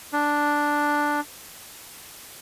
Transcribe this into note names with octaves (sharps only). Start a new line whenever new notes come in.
D4